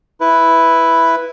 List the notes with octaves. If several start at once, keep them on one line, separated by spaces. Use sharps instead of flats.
E4 B4